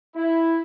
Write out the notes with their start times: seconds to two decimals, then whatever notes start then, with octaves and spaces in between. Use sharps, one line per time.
0.16 E4